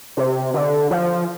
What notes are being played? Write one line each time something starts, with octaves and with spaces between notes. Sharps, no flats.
C3
D3
F3